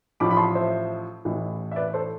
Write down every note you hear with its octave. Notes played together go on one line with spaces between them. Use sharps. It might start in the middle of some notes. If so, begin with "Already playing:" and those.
A1 A2 F3 B5 D6
B5
A5 C6
C5 E5
A1 A2 E3
E5
B4 D5
A4 C5